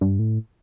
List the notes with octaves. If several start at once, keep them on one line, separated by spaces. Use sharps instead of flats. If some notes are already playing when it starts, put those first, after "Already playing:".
G2
A2